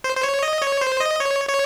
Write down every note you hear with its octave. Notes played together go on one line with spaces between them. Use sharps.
C5
C5
C#5
D#5
C#5
C5
D#5
C#5
C#5